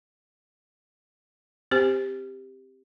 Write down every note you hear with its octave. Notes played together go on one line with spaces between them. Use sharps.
C4 G4 C5